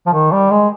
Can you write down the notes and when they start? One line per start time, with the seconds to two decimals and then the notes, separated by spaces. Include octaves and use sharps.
0.06 F3
0.13 D#3
0.32 G3
0.51 G#3